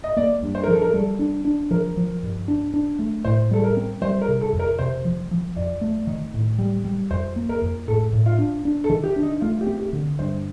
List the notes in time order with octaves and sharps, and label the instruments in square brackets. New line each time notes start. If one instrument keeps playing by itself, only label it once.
[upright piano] D#5
[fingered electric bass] A#3 [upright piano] D5
[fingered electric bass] G2
[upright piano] C5
A#4
[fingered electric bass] F3
[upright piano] A4
A#4
[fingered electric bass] G3 [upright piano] A4
[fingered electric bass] D4
D4
[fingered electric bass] F3 [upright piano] A#4
[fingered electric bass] F3
G2
D4
D4
A3
[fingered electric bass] A2 [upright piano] C5
[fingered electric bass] G3 [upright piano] A4
[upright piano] A#4
[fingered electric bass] C4
[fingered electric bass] G3 [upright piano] C5
[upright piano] A#4
[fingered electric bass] C3
[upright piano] A4
[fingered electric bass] F2
[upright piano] A#4
[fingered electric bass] C3 [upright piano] C5
[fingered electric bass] F3
F3
[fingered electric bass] F2 [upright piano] D5
[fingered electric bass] A3
D#3
A2
G3
G3
[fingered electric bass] F2 [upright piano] C5
[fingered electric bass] A#3
[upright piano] A#4
[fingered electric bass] F2
[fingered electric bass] A2 [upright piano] A4
[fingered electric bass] A2
[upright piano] F4
[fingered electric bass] D4
D4
[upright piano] A4
[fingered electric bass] D#3
[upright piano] G4
[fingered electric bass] D4
[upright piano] D#4
[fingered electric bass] A3 [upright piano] F4
[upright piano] G4
[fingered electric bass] C4
[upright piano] G4
[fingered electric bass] D3
[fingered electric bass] G2 [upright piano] C5